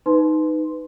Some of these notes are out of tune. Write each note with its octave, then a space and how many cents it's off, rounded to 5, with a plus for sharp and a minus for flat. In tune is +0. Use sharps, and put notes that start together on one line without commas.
D#4 +0 B4 +15 C6 +0